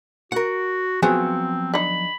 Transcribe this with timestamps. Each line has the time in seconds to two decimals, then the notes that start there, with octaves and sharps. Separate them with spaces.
0.32 F#4 A#4 F#5
1.03 F3 F#3 B3 C4 G#4
1.74 D3 D#4 B5